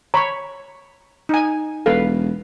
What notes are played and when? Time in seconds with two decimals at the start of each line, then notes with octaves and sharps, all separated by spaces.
0.14 C#5 A#5 B5 C#6
1.29 D#4 G#5
1.86 E1 A4 B4 F5